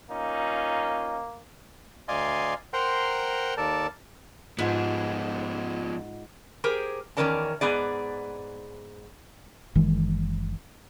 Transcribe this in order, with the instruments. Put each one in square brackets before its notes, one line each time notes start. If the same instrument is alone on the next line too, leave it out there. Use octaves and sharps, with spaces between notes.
[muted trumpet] A#3 [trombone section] C#4 D#4 F4
[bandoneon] D2 D5 D#5 F5 G#5 C6
A#4 C5 F#5 G5 A#5 C6
D#2 A4 A#4 D5 A5
[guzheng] G#2 [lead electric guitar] F3 B3 [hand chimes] F4 D#5 F#5
[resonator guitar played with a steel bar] G4 G#4 A#4 C5
E2 D#3 C#4 A#4 D5 A5
G#2 B3 G#4 D5
[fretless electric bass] F#1 D#3 E3 G#3